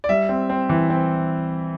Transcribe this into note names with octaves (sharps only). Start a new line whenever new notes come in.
D5
G3 E5
C4
C4
E3
C4